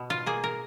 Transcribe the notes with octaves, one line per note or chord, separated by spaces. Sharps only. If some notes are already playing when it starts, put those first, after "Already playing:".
Already playing: B2
F4
A#3 G#4
A#4